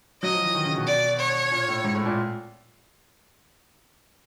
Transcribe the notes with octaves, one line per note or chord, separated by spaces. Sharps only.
F#3 D#5
F3
E3
D#3
C#3
B2
D5
C#5
A#2
A2
G#2
A2
A#2